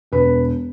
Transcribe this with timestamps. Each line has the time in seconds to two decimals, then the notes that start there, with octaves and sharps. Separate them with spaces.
0.12 E1 B4